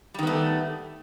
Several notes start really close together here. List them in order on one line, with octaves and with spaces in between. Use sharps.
G3 D#3 B3 A3